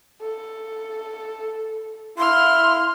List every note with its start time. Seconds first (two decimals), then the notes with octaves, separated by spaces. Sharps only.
0.22 A4
2.18 E4 F5 C6 F6